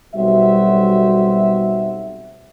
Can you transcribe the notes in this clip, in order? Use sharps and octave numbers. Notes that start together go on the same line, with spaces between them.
B1 G3 C4 F#4 E5